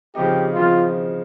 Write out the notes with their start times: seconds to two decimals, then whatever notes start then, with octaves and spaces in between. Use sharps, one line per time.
0.15 C#3 F3 C4 D#4 G4
0.54 C#3 F3 C4 D#4 F4